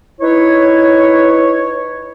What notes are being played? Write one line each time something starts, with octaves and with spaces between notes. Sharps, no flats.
D#4 E4 B4 C#5